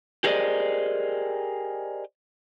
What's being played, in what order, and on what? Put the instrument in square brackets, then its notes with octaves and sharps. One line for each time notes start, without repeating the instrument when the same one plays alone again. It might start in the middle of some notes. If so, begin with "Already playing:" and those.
[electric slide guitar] G4 G#4 A#4 C5 D5 D#5